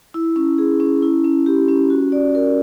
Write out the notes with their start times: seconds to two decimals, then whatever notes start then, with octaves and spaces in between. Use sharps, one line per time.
0.14 E4
0.36 C#4
0.58 G#4
0.80 C#4
1.02 E4
1.24 C#4
1.46 G4
1.69 C#4
1.90 F#4
2.12 D5
2.35 A#4